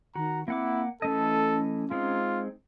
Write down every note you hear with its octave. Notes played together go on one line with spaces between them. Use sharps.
D#3 F#4 A#5
A#3 C4 E4 F#5 D6
E3 A3 C#4 A4 D#5
G#3 C4 D#4 F4